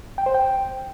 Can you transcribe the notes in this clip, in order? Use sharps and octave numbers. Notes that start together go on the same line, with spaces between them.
G5
C5
G5